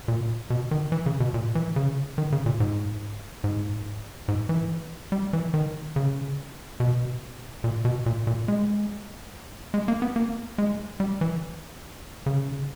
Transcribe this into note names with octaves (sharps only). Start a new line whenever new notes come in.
A#2
B2
D#3
E3
C#3
B2
A#2
E3
C#3
D#3
C#3
A#2
G#2
G#2
G#2
E3
G3
E3
D#3
C#3
B2
A#2
B2
A#2
A#2
G#3
G#3
A#3
B3
A#3
G#3
G3
E3
C#3